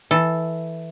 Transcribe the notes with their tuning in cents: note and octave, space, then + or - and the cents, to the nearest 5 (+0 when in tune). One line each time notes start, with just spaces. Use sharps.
E3 -5 A4 +0